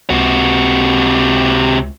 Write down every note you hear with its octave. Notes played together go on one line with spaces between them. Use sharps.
C#2 C3 F#4